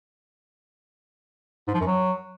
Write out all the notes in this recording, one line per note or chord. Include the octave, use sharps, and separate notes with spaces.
G#2
F3
F#2
F#3